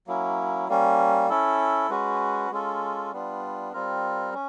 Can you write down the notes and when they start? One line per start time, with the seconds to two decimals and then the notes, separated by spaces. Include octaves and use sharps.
0.07 F#3 A#3 C#4 E4
0.69 G3 A#3 C#4
1.29 C#4 E4 A4
1.90 G#3 C#4 F#4 B4
2.51 G#3 C#4 F4 A4
3.12 G3 B3 D4 F4
3.73 G3 C4 F4 A#4
4.34 C#4